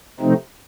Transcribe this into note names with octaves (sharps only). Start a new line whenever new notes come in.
C3 F3 A3 C4 D#4